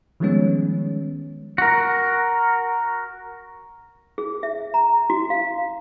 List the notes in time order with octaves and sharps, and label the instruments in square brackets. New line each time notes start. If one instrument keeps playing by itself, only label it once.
[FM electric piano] D#3 F3 G3 G#3 B3 C#4
[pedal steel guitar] F#4 A#4
[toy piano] G#4
E5
A#5
F#4
F5